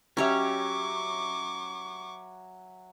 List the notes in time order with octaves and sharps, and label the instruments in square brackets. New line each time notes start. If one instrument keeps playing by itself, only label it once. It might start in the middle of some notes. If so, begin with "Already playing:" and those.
[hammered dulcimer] F#3 E5 [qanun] C#4 G4 C#5 [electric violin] C#6 D6